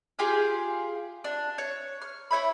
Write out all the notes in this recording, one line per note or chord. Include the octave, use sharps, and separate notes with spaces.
F4 G4 G#4 F5
D4
C#5
F6
E4 C#5 E5 B5